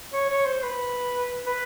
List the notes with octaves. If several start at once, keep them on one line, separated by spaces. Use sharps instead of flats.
C#5
C#5
C5
B4
B4